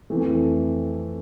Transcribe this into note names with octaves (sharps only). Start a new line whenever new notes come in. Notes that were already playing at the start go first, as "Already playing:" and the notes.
F2 E3 A3